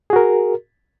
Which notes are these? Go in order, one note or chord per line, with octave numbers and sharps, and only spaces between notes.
F#4 G#4 A#4